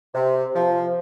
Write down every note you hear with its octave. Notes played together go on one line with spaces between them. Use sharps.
C3
F3